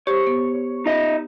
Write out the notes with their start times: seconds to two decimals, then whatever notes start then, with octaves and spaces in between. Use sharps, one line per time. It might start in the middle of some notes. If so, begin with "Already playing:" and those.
0.07 G4 C5 C#5
0.27 B3
0.86 D#4 D#5 E5